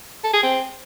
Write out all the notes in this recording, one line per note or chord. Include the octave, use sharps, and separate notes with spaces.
A4
G#4
C4